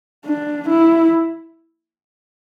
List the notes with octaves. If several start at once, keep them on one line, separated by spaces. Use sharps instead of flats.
D4
E4